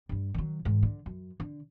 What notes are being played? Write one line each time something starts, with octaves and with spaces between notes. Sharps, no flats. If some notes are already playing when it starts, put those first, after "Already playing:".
G2 G3
D#3 F#3
G#2 D#3
D3
F#2
D3